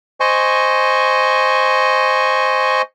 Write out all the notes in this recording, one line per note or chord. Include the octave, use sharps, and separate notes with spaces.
C5 D#5 G#5 C#6